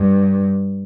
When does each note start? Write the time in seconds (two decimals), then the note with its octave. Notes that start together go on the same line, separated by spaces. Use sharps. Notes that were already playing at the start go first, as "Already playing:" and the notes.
Already playing: G2